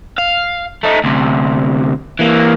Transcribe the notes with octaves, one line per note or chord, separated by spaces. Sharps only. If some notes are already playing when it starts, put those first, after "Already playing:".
F5
A3 D#4
D2 C3
E3 A#3